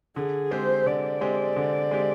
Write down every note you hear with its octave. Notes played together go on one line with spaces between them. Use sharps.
D3 G#4
G#3 C4 G4 C5
D3 D5
G#3 C4 G4
D3
G#3 C4 G4